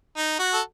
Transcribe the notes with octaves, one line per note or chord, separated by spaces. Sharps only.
D#4
F#4
A4